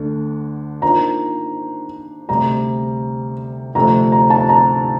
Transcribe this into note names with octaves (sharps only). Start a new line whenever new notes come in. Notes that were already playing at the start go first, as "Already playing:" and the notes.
Already playing: D2 D3 A3 D4
D#3 A#3 D4 F4 C5 A#5
D2 C3 G3 A#5
D2 C3 F3 A3 C4 A#5
A#5
A5
A#5